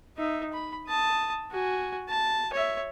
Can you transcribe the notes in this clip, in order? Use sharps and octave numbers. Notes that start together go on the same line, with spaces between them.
D#4 E5
B5
A5 D#6
F#4 G#5
A5
C#5 E5